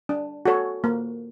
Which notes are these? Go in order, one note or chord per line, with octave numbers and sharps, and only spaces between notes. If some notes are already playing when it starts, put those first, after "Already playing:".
D4
F#4 A4 C#5
A#3